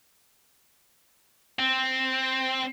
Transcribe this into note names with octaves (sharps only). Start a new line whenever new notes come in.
C4